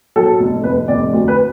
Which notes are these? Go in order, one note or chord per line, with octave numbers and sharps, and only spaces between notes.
F#3 A4
F1
F1 B4
F1 D5
D2
B4